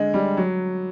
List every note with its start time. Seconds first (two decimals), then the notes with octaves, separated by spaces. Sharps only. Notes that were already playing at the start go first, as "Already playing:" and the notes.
Already playing: D3 G#3
0.14 G3
0.37 F#3